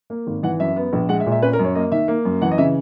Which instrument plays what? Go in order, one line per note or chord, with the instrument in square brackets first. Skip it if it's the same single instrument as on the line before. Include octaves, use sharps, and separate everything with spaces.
[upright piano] A#3
G#1
E3 F#5
F#2 E5
B3
A#1
G#3 F#5
E5
A#2
E5
C#4 B4
A#4
F#2
C#5
A#3 D#5
D#3 E5
A#3
F#2
E3 F#5
D#5
C#3 E5